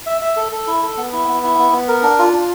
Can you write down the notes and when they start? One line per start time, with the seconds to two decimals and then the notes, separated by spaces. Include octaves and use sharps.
0.06 E5
0.21 E5
0.36 A4
0.52 A4
0.67 E4
0.83 A4
0.97 B3
1.13 E4
1.28 B3
1.43 E4
1.58 B3
1.72 B3
1.88 A#4
2.03 D4
2.19 F4
2.33 D4